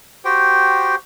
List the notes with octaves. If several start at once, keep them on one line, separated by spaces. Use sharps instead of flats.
F#4 G4 C5 G5